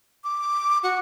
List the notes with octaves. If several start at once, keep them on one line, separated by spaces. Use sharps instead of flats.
D6
F#4